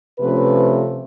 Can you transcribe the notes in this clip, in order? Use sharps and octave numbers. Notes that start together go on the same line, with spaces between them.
C3 F3 A3 C#4 B4